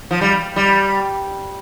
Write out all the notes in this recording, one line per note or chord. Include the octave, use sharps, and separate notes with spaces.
F3
G3
G3